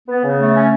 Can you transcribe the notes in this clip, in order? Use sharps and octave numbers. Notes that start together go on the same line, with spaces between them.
B3
C#3
A3
C#4